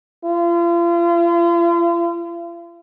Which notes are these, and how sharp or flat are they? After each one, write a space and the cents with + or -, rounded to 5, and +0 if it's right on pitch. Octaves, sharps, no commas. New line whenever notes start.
F4 -40